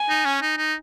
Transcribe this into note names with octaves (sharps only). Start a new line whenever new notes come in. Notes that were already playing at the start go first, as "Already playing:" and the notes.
Already playing: G#5
D#4
C#4
D#4
D#4